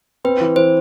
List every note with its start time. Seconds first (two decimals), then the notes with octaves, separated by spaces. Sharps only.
0.24 C4 B4
0.41 E3
0.56 E3 C5